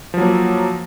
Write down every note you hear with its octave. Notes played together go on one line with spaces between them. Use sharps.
F3 F#3 A#3